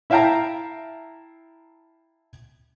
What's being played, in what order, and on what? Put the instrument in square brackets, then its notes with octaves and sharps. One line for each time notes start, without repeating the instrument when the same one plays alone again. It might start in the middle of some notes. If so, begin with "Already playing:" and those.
[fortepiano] E4 E5 F5 G5 A5 A#5